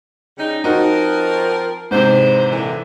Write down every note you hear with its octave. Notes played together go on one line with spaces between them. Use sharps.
C#3 G3 D#4
F3 C4 D#4 F#4 A#4
G#2 C3 E3 G#3 C5
A#2 D3 E3